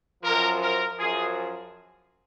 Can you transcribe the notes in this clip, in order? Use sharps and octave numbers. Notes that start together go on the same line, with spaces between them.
F#2 F3 A#4
A#4
F#2 F3 G#4